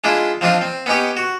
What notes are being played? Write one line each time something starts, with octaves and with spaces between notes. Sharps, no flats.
G#3 D4 E4 F4
F3 C4 D4 D#4 F4
C4
B3 C#4 D#4 G4
F#4